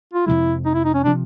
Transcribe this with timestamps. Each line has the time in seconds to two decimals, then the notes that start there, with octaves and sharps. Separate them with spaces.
0.13 F4
0.26 F2 C3 F3 G#3 E4
0.65 D#4
0.74 E4
0.85 D#4
0.94 C#4
1.04 C3 F3 D4